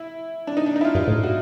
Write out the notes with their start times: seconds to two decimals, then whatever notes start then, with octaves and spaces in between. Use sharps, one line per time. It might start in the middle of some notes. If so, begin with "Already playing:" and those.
Already playing: E4
0.47 D4
0.57 D#4
0.66 D4
0.76 D#4
0.81 E4
0.85 F4
0.95 G2 F4
1.07 A2
1.23 F#4